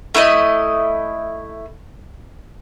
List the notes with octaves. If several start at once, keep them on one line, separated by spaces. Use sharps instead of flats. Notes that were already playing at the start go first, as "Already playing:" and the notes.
A3 E4 B4 D#5